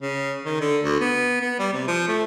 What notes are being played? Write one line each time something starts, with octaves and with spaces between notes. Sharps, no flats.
C#3
D#3
D3
D2
B3
B3
G3
C3
F3
A3